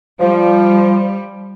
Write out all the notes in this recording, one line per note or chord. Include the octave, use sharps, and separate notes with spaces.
F3 G3